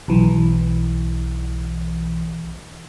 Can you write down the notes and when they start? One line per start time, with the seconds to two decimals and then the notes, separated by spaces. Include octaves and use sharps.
0.08 B1 E3